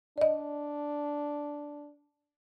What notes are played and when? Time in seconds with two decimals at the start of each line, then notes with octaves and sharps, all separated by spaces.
0.18 D4 D5 D#5